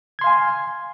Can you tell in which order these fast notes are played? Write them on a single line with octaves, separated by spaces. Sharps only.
G#6 C6 F5 G#5